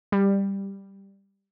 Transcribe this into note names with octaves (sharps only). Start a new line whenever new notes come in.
G3